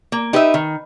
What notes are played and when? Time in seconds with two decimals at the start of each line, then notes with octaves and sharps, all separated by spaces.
0.12 A#3
0.33 D#4 G4 B4 E5
0.54 D#3